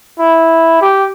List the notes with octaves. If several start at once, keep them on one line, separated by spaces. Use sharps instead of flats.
E4
G4